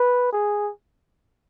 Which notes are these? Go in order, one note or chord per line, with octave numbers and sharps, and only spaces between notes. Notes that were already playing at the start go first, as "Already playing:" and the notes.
Already playing: B4
G#4